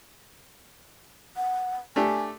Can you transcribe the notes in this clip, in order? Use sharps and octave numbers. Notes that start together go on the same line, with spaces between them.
F#5
A3 D4 G4 G#5